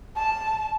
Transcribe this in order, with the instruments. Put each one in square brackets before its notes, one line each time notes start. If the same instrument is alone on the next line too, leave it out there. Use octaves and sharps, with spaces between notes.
[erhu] A5